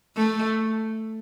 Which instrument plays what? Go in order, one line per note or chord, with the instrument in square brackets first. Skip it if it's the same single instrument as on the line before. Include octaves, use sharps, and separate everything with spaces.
[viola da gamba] A3